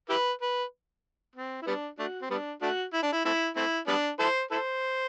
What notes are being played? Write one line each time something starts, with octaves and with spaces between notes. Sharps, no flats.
E4 G4 B4
B4
C4
E4
G3 B3 D4
A3 D4 F#4
C4
G3 B3 D4
A3 D4 F#4
E4
D4
E4
A3 C4 E4
A3 C4 E4
G3 B3 D4
E4 A4 C5
E4 A4 C5